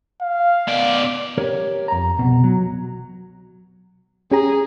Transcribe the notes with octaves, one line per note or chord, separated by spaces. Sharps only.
F5
B2 D5
G4 A#4 C#5
F2 A#5
C2 B2
F#3
C#4 G4 G#4 A#5